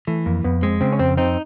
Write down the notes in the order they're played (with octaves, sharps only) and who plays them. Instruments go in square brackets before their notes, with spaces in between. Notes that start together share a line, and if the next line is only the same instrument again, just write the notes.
[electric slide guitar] E3 [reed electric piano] A3
[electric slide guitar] F2 [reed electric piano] A#3
[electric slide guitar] F2 [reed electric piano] B3
[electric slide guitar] G#3 [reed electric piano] C4
[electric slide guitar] C#3 [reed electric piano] C4
[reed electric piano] C#4
[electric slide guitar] F2 [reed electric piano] C4
[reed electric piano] C4 [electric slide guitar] D#4